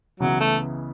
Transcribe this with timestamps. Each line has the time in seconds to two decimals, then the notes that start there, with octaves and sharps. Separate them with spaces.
0.20 C#2 C#3 E3 F#3 B3 E4
0.41 A3